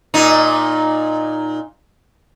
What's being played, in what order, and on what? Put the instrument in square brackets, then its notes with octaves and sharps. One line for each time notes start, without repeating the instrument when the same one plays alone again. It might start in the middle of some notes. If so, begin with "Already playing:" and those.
[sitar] A#2 D#4